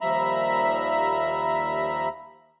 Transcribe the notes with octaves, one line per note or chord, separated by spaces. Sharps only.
D#2 F3 G3 E5 A#5 B5